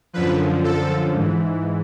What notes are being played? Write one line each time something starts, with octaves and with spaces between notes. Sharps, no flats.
F#2 D3 F3 B4
A4
G#2 E3